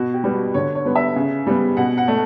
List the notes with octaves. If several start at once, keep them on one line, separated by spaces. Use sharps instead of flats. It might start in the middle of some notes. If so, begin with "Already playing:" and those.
Already playing: B2 F#4
G4
G3 B3
F#4
D3 C#5
C#5
G3 B3
E5
C#3
G3 B3
B2 F#5
F#5
A3